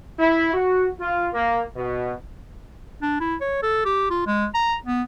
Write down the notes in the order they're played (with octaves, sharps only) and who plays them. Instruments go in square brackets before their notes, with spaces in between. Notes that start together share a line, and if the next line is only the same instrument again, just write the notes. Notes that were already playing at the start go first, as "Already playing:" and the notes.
[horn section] E4
F#4
F4
A#3
B2
[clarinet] D4
E4
C#5
A4
G4
F4
G#3
A#5
B3